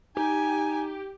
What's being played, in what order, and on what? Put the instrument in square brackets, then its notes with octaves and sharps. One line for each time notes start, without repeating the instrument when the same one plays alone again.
[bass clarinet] D#4 [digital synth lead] G4 [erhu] G#5